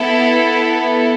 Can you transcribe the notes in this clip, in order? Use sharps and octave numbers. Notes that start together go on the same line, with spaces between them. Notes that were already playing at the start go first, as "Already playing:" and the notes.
Already playing: B3 E4 A4